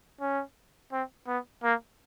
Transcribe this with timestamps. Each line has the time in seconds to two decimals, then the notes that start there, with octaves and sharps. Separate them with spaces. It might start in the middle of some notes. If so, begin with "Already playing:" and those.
0.21 C#4
0.92 C4
1.27 B3
1.63 A#3